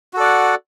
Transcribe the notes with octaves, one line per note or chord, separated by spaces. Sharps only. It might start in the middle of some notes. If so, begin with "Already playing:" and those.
F#4 A4 D5 F#5